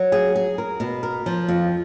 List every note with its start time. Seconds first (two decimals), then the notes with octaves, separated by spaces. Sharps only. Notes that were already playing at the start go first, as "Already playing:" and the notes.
Already playing: F#3
0.12 G#4
0.36 G#4
0.58 A#4
0.80 B2
1.03 A#4
1.26 F3
1.48 F2